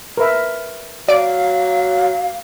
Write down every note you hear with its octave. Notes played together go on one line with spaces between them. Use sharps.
A#4 B4 E5
F#3 D5 F5 D7